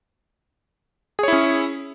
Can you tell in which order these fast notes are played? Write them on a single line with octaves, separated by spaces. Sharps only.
G#4 C#5 E4 C#4